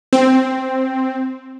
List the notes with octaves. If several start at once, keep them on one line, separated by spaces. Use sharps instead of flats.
C4